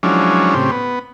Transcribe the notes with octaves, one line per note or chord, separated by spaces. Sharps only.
F3 F#3 G#3 C#4 D4 E4
A2 C#3 C4 G4
B3